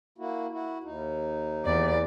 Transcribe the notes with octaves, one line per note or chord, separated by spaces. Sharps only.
A#3 E4 F#4
E4 F#4
D#2 D#4
E2 D5